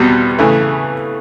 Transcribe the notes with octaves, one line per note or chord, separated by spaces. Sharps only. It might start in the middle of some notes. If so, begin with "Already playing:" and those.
Already playing: E2 B2 G3 C4
C#3 E3 A3